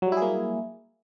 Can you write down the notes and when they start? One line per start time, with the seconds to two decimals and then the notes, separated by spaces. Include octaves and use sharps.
0.02 F#3
0.07 G3
0.12 E4
0.17 G#4
0.22 A#3